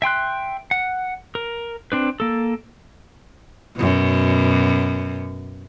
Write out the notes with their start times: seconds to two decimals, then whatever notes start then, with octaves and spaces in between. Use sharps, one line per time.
0.02 E5 G5 C6 F#6
0.71 F#5
1.35 A#4
1.92 C4 D4 B4
2.20 A#3 A4
3.76 F#2 B2